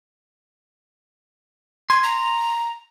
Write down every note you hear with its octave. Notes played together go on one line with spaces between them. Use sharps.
C6 G#6
A#5